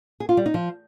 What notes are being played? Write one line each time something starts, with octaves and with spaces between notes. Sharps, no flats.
G#4
F4
G3
D#4
F3